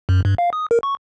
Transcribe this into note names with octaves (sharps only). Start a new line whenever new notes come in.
F#2
G2
F5
D#6
A#4
C#6